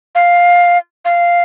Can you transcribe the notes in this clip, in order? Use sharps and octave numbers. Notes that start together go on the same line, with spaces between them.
F5
F5